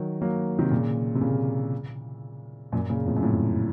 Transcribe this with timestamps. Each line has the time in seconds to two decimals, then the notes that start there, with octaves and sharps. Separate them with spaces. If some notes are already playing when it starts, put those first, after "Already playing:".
Already playing: D#3 F#3
0.21 F#3 A#3
0.59 C3 D#3
0.71 A#2 C#3
1.15 C3
1.21 A#2 C#3
2.72 F#2 A#2
2.90 A#2 C#3
3.06 F2 A2
3.16 F#2
3.23 F2 A2